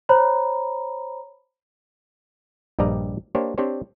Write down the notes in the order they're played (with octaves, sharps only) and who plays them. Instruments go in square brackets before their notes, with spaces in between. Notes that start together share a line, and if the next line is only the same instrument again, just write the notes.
[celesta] C5 C#5 A#5 B5
[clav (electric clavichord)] A#1 G2 G3 D5 D#5 A#5
A#3 D4 G4 C5 C#5
C4 D4 G4 C5 C#5